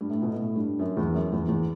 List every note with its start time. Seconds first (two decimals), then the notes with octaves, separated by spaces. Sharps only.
0.01 G2
0.10 A2
0.22 B2
0.33 A2
0.56 G2
0.79 F#2
0.97 E2
1.14 F#2
1.32 E2
1.48 E2